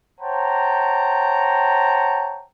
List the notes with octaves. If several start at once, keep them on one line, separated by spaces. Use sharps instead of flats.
C5 C#5 F#5 G5 A5 A#5